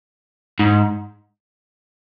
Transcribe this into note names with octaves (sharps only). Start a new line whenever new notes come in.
G#2